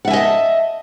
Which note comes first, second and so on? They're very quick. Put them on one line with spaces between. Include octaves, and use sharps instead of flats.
F#5 E5 G#5 D#5 A5